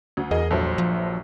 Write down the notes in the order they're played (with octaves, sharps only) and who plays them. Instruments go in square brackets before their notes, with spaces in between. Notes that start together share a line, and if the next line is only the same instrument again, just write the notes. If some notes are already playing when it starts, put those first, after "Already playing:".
[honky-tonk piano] D2
[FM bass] E2 [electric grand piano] G#4 A#4 D#5
[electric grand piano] A#1 G2 F#3 [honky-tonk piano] A4 C5 E5
[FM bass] F3